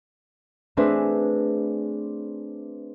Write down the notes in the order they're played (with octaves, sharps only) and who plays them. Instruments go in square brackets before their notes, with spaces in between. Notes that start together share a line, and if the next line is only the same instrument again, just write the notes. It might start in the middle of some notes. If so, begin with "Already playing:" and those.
[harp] A3 C4 D4 G#4 B4 E5